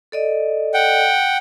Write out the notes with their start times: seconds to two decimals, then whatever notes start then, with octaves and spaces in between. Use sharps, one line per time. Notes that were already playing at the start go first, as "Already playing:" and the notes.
0.12 A4 D5 D#5
0.74 F#5 G5